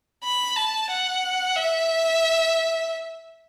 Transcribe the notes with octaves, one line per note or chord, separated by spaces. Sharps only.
B5
A5
F#5
E5